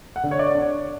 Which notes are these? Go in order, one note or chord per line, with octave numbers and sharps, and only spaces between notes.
F#5
D3
C#5
D5
D4
C#5